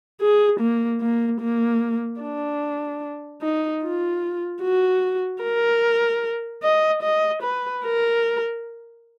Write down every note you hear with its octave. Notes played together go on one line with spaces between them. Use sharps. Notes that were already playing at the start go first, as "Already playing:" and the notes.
G#4
A#3
A#3
A#3
D4
D#4
F4
F#4
A#4
D#5
D#5
B4
A#4